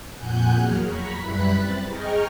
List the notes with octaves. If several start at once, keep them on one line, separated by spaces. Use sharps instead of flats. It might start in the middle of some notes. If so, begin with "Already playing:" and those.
F2 A#2 F#5 G#5 F#6 G6
E2 F#3 A#3 G#4 F6
A#5 B5 C#6 B6
F#2 G3 E4 B4 B5 F#6
C4 A6
G#4 D#5 G5 A#5 C#6 F6